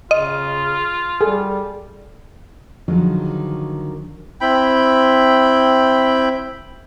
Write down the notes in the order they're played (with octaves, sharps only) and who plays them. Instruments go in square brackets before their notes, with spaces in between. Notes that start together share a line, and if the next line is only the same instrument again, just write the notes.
[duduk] C#3 [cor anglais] F4 [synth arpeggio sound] D#5
[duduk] G3 [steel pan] G#4 A4
[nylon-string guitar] D3 D#3 F3 F#3 G#3
[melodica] C4 E4 G5 B5